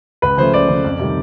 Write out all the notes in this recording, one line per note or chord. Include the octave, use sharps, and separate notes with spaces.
C#2 B4
C#3 F3 A3 C5
C#2 D5
C#3 F3 A3
F2
C3 D#3 G3